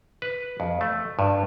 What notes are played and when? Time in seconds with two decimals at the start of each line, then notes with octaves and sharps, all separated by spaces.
0.22 B4
0.60 F2
0.81 A3
1.19 G2